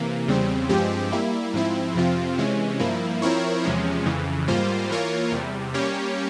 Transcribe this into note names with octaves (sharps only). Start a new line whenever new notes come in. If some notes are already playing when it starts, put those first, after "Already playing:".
Already playing: C3 E3 A#3
E2 C#3 G3 C4
G2 F3 G#3 C4 G4
G3 A#3 E4
G#2 F3 C4 E4
F2 C3 F3 C4 F4
C3 E3 G#3 C#4
G2 F3 A#3 E4
F3 C4 E4 A#4 C#5
E2 C3 F3 G#3 C#4
F2 C#3 E3
G#2 G3 A#3 F4 C5
E3 A#3 F4 A#4 C#5
E2 C3 G3
G3 A#3 C#4 G4 C#5